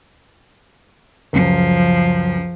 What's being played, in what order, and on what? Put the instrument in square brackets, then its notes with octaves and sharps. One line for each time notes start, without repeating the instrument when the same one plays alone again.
[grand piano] C#2 F#2 [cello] F3